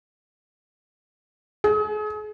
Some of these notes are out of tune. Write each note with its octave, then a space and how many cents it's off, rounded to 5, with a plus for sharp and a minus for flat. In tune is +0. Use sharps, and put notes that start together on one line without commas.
G#4 +35